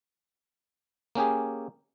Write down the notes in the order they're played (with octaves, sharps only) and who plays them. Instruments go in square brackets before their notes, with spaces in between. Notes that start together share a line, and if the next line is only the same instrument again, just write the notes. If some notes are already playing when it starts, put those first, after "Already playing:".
[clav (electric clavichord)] A#3 C#4 G4 G#4